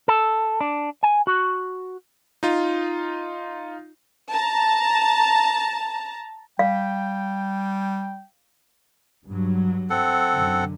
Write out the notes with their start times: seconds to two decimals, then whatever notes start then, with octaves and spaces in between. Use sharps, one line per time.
0.08 A4
0.61 D4
1.03 G#5
1.27 F#4
2.43 D#4 F4
4.30 A5 A#5
6.59 G3 F5 G5
9.26 G2 F#3
9.90 C4 A4 F#5
10.34 F#2 D3